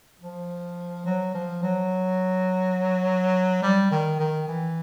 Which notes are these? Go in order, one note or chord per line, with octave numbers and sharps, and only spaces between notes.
F3
F#3
F3
F#3
G3
D#3
D#3
E3